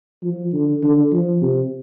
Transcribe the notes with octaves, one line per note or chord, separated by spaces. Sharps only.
F3
D3
D3
F3
C3